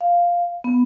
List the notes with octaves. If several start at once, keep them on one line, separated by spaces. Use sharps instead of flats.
F5
B3